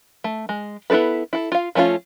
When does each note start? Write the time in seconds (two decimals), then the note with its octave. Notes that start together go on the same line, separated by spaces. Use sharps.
0.24 A3
0.49 G#3
0.90 B3 E4 F4 A4 B4
1.33 E4 A4
1.52 F4 F5
1.75 F3 A3 C#4 D#4 F4